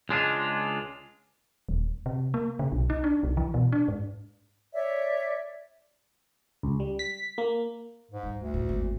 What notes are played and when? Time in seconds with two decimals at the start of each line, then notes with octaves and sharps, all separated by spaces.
0.09 C#2 G#3 D4 F4
1.69 D#1
2.06 C3
2.34 A#3
2.59 C#3
2.72 B1
2.90 D#4
3.04 D4
3.23 C2
3.37 E3
3.54 B2
3.72 D4
3.88 G#2
4.73 C#5 D5 E5
6.63 C#2
6.80 G3
6.99 B6
7.38 A#3
8.11 G#2
8.23 G3
8.39 D2
8.54 A2
8.69 G#1 E2